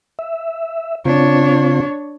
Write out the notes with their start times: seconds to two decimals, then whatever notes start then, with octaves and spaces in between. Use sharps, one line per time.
0.19 E5
1.05 C#3 C4 D4 F4 C#5